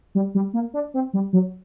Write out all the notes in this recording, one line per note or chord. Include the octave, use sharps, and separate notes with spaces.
G3
G3
A#3
D4
C4
G3
F#3